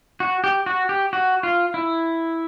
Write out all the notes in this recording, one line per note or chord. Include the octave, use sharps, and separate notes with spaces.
F#4
G4
F#4
G4
F#4
F4
E4